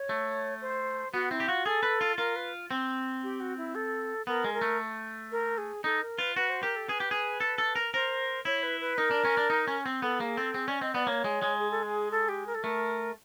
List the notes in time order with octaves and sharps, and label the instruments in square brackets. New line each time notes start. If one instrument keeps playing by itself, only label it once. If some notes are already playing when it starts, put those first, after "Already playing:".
Already playing: [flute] C#5
[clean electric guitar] A3
[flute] C5
[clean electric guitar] B3 [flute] F#4
[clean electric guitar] C4 [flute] E4
[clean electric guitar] G4
[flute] F4 [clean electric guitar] F#4
[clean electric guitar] G#4 [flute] A4
[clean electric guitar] B4
F4
[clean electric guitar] F4 [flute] A#4
[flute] B4
[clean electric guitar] C4
[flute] G4
F#4
E4
A4
[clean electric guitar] B3 [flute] A#4
[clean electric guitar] G#3
[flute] A#4
[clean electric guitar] A3
[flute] A#4
G#4
[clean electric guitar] D#4 [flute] A4
[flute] A#4
[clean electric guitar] F4 [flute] B4
[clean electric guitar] F#4 [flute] B4
[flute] C5
[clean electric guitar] G4 [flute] A#4
[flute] A4
[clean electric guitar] G#4 [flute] B4
[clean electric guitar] G4
G#4
A4
A4
A#4
[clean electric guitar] A#4 [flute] C5
[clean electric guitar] E4 [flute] C#5
[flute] B4
B4
[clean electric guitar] D#4 [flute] A#4
[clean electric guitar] D4
C#4
D4
D#4
C#4
C4
[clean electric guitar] B3 [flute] A4
[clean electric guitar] A#3 [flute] G#4
[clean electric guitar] C4 [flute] A4
[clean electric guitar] C4 [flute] G#4
[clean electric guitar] C#4 [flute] D5
[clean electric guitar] C4 [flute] D#5
[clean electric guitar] B3 [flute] D5
[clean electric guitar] A#3 [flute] C#5
[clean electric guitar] G#3
G#3
[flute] G#4
A4
G#4
A4
G4
A#4
A4
[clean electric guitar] A3 [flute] A#4